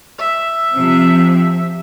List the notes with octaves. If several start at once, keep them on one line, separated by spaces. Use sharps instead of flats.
E5
C3 F3